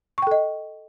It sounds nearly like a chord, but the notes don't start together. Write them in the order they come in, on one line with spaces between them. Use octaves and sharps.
C#6 G5 A4 D#5